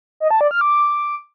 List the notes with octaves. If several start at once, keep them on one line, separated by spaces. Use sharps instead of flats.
D#5
A5
D5
F6
D6